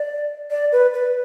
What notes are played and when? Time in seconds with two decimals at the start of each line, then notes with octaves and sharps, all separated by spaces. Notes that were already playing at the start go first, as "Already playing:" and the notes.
Already playing: D5
0.51 D5
0.72 B4
0.94 B4